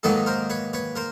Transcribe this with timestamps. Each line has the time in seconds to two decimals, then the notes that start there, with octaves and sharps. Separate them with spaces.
0.03 G#2 D#3 F#3 A#3 A4 B4
0.26 A#4 C5
0.50 B4 C#5
0.73 B4 C#5
0.96 A#4 C5